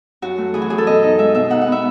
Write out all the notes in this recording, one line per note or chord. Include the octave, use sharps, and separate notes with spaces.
F#2 F#4
A3
E3 G#4
F#4
F#2 G#4
A4
B2 D#5
D#4
G#3 E5
B2 E5
D#4 F#5
F#5
B3 E5